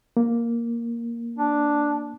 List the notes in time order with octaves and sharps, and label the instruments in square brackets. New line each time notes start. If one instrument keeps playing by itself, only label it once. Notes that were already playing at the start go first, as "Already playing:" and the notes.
[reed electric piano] A#3
[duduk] D4